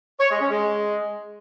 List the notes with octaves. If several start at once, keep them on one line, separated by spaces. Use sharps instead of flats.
C#5
G#3
C#4
G#3